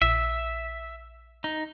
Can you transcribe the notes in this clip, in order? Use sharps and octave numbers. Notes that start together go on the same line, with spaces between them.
A#1 E5
D#4